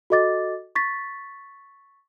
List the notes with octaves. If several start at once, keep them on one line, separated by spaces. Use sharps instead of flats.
F#4 A4 D#5 D6 A6
C#6 A6 B6